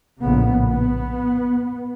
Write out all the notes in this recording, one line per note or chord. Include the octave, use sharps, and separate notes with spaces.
A#1 A2 C#3 B3
B3